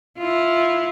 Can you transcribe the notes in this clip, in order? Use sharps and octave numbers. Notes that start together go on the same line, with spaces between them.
E4 F4